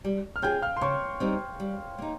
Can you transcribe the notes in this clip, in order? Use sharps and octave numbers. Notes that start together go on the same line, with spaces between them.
G3
F6
C#4 F4 G#4 G5 G6
F5 F6
C6
C#3 C#5 C#6
G3 C4 D#4
G3
A#3 D#4